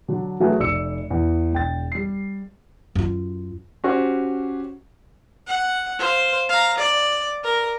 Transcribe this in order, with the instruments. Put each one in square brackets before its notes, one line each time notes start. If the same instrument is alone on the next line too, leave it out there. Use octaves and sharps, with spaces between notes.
[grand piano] D3 F#3 D4
F#3 A3 F#4 G#4 B4
F1 D5 E6 C#7
E2
E1 G5 A6
G3 C7
[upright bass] F#2 F4
[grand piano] C#4 F#4 G4 C5
[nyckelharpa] F#5
C5 F5
F5 A#5
D5
A#4